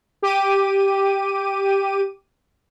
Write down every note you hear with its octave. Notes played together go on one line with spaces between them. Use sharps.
G4 D6 D#7